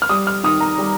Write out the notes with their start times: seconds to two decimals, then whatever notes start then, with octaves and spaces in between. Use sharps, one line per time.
0.02 F6
0.09 G3 D#6
0.27 F6
0.43 D#3 D#6
0.61 A#5
0.78 G3